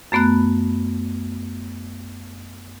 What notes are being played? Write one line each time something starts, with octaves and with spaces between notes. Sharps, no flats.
F#2 A3 B3 B5 F#6